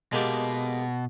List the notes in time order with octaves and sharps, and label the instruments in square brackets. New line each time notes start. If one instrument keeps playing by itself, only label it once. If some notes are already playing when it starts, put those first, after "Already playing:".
[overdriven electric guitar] B2 [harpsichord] G#3 A#3 G4